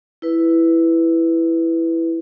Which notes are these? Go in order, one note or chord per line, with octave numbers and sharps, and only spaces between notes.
E4 B4